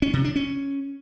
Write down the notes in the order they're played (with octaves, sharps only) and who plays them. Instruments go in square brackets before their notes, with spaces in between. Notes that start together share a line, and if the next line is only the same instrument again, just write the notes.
[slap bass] C#4
C3
D4
C#4